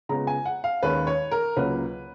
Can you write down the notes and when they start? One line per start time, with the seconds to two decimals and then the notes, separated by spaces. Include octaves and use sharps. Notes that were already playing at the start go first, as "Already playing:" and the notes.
0.09 C#3 G#3 B3 F4 A#5
0.27 G#5
0.46 F#5
0.64 F5
0.83 D#2 D#3 G#3 C#4 B4
1.07 C#5
1.31 A#4
1.57 C#2 C#3 F#3 A#3 C#4 B4